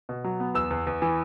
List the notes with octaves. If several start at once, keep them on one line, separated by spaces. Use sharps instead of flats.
B2
F#3
B3
E2 E6
E2
E2
E3